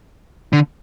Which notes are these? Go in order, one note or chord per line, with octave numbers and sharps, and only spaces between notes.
D3